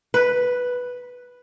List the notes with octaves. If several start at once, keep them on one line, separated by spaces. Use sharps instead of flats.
B4